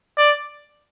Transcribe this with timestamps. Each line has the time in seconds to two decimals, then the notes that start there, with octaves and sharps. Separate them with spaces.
0.17 D5